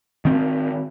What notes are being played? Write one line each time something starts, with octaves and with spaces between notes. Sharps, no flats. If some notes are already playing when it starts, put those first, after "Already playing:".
D#3 C4